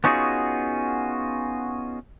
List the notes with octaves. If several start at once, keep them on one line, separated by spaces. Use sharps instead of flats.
B3 C#4 D#4 F4 F#4 G#4